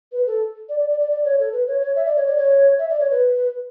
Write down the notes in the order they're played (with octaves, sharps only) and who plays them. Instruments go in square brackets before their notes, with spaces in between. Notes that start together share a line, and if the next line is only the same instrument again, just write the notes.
[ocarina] B4
A4
D5
D5
D5
D5
D5
C#5
A4
B4
C#5
C#5
E5
D5
C#5
D5
C#5
E5
D5
C#5
B4